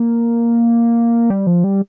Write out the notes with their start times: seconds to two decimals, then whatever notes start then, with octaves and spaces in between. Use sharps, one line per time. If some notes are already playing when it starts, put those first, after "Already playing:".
Already playing: A#3
1.30 G3
1.47 F3
1.64 G3